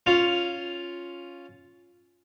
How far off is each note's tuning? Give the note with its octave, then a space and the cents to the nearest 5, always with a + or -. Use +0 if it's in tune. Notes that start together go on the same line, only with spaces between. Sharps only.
C#4 +0 F4 +0